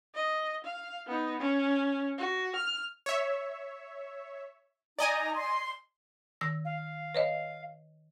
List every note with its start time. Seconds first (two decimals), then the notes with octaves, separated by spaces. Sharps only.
0.15 D#5
0.64 F5
1.07 B3 D#4
1.39 C#4
2.18 F#4
2.56 F6
3.06 C#5 E5
4.99 D#4 D5 D#5 G#5 A#5
5.36 C6
6.41 D#3 E6 A#6
6.65 F5
7.15 B4 C#5 D#5